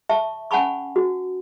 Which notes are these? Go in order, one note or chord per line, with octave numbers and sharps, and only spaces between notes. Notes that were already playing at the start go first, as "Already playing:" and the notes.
E5 A5 C#6
C#4 F#5 G#5 A5 B5 C#6
F#4